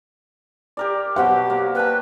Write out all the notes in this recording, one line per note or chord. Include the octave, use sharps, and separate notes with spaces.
G4 A#4 D5
B2 F#3 G4 C5 F#5
A#3
B4 G5 A5